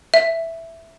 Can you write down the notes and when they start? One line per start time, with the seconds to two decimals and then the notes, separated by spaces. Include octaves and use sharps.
0.14 E5